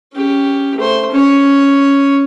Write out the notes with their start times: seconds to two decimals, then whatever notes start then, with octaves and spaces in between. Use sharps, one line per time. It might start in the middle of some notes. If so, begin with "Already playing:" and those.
0.14 C#4 G4
0.77 A3 C5
1.12 C#4 C#5